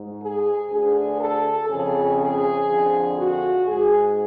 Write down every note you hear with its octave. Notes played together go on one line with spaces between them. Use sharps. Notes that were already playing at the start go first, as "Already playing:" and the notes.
Already playing: G#2
G#4
D2 D3 G#4
A4
F2 C#3 G#4
G#4
F2 D3
F#4
G#2 G#4